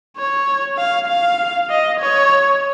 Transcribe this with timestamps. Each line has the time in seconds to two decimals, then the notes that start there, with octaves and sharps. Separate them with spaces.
0.17 C#5
0.78 F5
1.08 F5
1.70 D#5
2.00 C#5